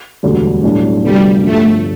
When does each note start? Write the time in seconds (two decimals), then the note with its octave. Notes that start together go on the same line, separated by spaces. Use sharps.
0.23 E1 D2 D3 G3
0.63 B1 A2 G3 D4
1.03 D2 C3 F3 G3 B3
1.44 G1 G2 D3 F3 A3